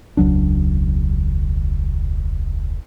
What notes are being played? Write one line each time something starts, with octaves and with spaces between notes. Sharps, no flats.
E1 C#2 F#3 D4